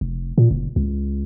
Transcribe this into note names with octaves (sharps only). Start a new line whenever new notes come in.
F1
A#2
F#1
C#2